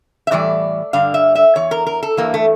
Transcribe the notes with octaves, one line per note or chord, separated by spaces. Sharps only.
E5
A2 E3 G3 D5
G2 D3 G3 F5
E5
E5
E2 E3 C#5
A#4
A#4
A4
G2 E3 G3 A#3
A3